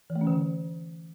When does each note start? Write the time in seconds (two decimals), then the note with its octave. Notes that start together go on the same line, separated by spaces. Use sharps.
0.10 E3
0.16 A3
0.21 C#4
0.27 D3